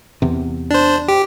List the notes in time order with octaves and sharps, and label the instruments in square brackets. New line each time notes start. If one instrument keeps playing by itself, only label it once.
[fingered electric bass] E2 C3
[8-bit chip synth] D4 C5
G4